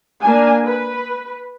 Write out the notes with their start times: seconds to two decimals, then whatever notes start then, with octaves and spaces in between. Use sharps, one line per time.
0.21 A#3 D4 G#5
0.65 B4